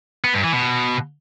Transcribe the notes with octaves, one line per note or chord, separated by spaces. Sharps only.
B3
G2
E3
B2